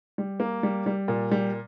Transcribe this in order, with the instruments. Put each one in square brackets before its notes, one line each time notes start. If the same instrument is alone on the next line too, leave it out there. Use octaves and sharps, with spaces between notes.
[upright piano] G3
A#3
G3
G3
A#2
G3